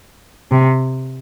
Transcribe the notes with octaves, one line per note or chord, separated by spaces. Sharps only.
C3